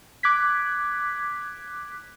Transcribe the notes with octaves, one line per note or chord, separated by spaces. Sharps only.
D6 F#6 G#6 B6